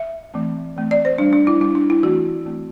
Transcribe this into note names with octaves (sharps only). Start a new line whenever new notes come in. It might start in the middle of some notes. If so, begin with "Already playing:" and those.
Already playing: E5
E3 A3 C4
E3 A3 C4
D5
C5
G3 D4
D4
E4
G3 D4 E4
D4
E4
E3 A3 C4 F#4
E3 A3 C4